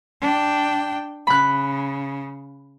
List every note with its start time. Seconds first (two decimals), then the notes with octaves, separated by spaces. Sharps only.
0.21 D4 G5
1.27 C#3 B5 F#6